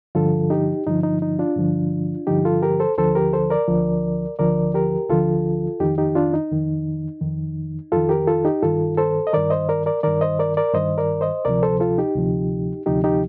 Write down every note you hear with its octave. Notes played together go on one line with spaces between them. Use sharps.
G2 D3 F3 F4 A4
D#4 G4
G2 D3 F3 D#4
D#4
D#4
D4 F4
G2 D3 F3
G2 D3 F3 D#4 G4
F4 A4
G4 A#4
A4 C5
D2 D3 F3 A4 C5
G4 A#4
A4 C5
A#4 D5
D2 D3 F3
D2 D3 F3 A#4 D5
G4 A#4
D2 D3 F3 F4 A4
F2 D#3 D#4 G4
D#4 G4
D4 F4
D#4
F2 D#3
F2 D#3
F2 D#3 F4 A4
G4 A#4
F4 A4
D#4 G4
G2 D#3 F4 A4
A4 C5
D#5
G2 D#3 A#4 D5
C5 D#5
A#4 D5
A#4 D5
G2 D#3 A#4 D5
C5 D#5
A#4 D5
A#4 D5
G2 D#3 C5 D#5
A#4 D5
C5 D#5
D2 C3 F3 A#4 D5
A4 C5
F4 A4
D#4 G4
D2 C3 F3
D2 C3 F3 D#4 G4
D#4 G4